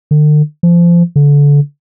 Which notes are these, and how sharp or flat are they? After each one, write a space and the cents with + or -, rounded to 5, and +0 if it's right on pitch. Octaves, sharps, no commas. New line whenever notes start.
D3 +40
F3 -25
D3 -30